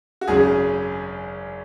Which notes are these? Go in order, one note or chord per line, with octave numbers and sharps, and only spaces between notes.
F#4
G#1 F#2 C#3 G#3 C#4 G#4